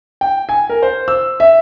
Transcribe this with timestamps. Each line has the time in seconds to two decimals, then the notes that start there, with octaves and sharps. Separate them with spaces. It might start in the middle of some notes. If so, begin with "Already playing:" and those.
0.21 G5
0.49 G#5
0.69 A#4
0.83 C5
1.08 E6
1.40 E5